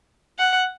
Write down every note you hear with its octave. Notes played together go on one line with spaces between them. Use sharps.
F#5